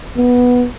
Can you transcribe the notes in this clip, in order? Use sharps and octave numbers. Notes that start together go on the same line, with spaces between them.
B3